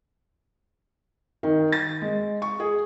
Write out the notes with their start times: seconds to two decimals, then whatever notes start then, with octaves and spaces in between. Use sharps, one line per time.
1.43 D#3
1.72 A6
2.02 G#3
2.42 C#6
2.60 G#4